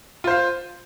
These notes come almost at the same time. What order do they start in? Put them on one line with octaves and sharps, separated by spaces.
F4 C5 F5